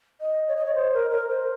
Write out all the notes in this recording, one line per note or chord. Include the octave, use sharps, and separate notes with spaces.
D#5
C#5
D#5
C#5
C5
A#4
A#4
C5